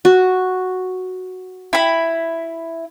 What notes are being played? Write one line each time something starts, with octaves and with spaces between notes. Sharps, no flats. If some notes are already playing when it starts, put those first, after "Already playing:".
F#4
E4 B5